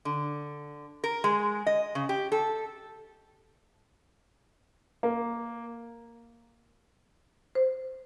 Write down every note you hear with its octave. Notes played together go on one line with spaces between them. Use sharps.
D3
A#4
G#3
D#5
C#3
G4
A4
A#3
C5